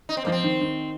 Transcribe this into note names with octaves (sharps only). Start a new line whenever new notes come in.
D#4
C4
F3 A#3
C4
D#3
D#3